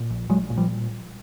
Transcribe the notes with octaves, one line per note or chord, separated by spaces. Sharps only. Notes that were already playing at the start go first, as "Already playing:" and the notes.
Already playing: A#2
A#1
A#1 F#3 G#3
A#2
F3 G3